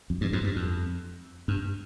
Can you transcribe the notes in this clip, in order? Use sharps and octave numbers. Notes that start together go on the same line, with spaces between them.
F2
G2
F2 G#2
G2
F2
G2